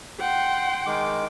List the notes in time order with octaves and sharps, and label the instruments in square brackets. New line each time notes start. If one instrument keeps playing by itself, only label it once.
[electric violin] F#5 [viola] G5 C6
[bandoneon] D#3 G#3 D6